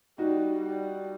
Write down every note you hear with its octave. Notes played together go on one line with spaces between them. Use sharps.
G3 D#4 F#4
G3